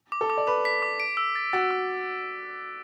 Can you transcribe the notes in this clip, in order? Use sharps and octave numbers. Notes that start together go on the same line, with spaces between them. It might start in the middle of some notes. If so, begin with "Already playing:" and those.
D6
A4
D6
D5
B4 D6
B6
D6
D7
E6
A6
F#4 A6
E6